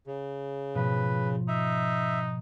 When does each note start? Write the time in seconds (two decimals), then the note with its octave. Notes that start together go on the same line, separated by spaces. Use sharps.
0.07 C#3
0.75 G#2 B2 F3 B4
1.48 D#4 E5